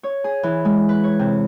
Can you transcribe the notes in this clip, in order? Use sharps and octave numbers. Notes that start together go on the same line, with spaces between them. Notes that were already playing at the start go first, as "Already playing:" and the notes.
C#5
G#4
E3
G#3
B4
C#5
C3